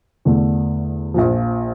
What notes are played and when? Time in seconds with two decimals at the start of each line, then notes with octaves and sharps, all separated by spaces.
0.25 E2 D3 A3 D4
1.14 A#1 A#2 F3